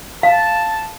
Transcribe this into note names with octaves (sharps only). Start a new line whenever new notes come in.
F5 A5